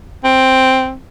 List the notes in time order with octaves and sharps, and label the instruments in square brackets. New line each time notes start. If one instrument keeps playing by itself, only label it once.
[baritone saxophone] C4